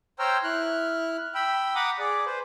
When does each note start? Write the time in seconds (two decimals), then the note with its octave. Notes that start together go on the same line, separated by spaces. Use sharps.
0.19 C5 C#5 G5 A#5 E6 F6
0.44 E4 F6 F#6
1.35 G5 B5 E6
1.75 F#5 A#5 B5 D6 D#6
1.99 G#4 D5
2.26 B4 C5